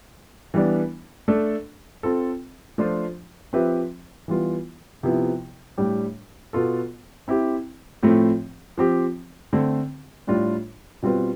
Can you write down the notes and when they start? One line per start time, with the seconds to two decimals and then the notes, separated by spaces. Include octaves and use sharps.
0.54 E3 G3 B3 D4
1.28 A3 D4 A4
2.03 C4 F4 A4
2.78 F3 A3 D4 F4 C5
3.53 F3 C4 G4 B4 E5
4.28 E3 G3 B3 F4
5.03 C3 F3 B3 E4
5.78 A2 G3 D4 G4
6.53 B2 B3 F4 A4
7.28 C4 E4 G4
8.03 A2 F3 A3 C4
8.78 F3 C4 G4
9.53 D3 A3 C4
10.27 A2 G3 D4 F4
11.02 B2 G3 C4 F4 B4